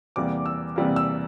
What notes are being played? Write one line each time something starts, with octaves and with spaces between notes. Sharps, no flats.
E2 C3 G3 A#3 D6
E6
E2 C3 G3 A#3
E6